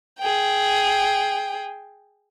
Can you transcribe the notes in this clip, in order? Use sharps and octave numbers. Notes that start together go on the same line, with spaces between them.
G#4 G5